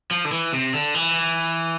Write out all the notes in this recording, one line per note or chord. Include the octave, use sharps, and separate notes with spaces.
F3
D3
E3
C3
D3
E3